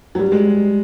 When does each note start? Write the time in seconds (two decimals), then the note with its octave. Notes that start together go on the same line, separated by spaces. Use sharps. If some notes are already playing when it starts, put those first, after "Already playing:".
0.15 F#3
0.19 G3
0.32 G#3